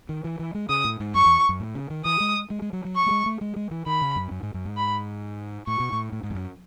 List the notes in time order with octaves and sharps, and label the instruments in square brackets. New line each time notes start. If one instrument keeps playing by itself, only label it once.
[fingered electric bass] D#3
E3
E3
G#3
[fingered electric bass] C#3 [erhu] D#6
[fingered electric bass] A2
G#2
[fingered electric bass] F#2 [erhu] C#6
[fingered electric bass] E2
F#2
A2
C#3
D#3
[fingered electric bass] E3 [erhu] D#6
[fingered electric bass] G#3
G#3
G#3
F#3
F#3
[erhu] C#6
[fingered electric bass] A3
G#3
A3
G#3
G#3
E3
[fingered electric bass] D#3 [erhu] B5
[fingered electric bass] C#3
F#2
F#2
G#2
F#2
G#2
[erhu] B5
[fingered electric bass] A2 [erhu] C#6
[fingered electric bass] B2
A2
A2
G#2
E2
F#2